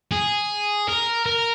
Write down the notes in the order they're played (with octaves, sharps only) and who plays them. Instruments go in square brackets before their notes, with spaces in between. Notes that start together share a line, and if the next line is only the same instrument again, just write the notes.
[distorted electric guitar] G#4
A#4
A#4